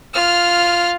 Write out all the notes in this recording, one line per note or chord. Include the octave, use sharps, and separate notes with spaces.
F4 F6